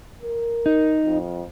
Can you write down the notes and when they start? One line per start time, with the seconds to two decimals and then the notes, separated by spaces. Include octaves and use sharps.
0.21 A#4
0.66 D#4
1.05 F2